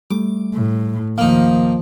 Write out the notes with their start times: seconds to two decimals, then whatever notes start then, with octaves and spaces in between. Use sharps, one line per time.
0.11 G3 A3 D6
0.54 A2
1.18 D#2 D#3 F3 A#3 D#4 F5